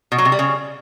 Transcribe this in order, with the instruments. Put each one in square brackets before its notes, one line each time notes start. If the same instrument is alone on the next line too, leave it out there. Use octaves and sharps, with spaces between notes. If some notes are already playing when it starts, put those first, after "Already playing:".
[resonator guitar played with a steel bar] B2
F#3
C3
G3
C#3